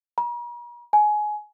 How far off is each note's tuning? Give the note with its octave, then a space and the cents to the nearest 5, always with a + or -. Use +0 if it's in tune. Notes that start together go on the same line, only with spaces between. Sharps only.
A#5 +45
G#5 +20